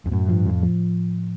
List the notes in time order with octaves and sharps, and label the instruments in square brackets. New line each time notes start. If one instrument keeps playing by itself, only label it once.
[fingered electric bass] F2
[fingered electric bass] F#2 [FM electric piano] A2
[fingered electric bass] G2 [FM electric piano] F3
[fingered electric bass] F2 [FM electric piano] F3
[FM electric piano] F3